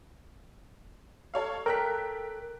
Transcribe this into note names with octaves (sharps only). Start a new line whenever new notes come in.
A4 C#5 F5
A4 A#4 G5 F#6 B6